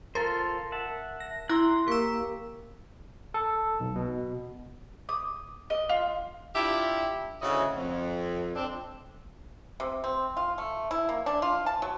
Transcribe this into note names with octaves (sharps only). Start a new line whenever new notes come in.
F4 A4 A#4 C5
E5 F#5 A5
A#6
E4 A#5 C6 F#6
A#3 G4 C#6 E6
A4
B1
B2
D#6
D#5
F4
D4 E4 F4 G4 E5
D2 C#3 C#4 E4 F#4 D#5
F2
C4 D4
C3
C4
F4
A3
E4
A#3
D4
F4
A5
F#3